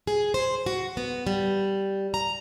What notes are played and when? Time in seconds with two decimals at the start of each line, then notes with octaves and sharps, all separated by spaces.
0.07 G#4
0.34 C5
0.66 F#4
0.97 B3
1.27 G3
2.14 A#5